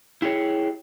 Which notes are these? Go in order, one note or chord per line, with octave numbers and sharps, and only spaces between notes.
E4 G4 G#4 C#5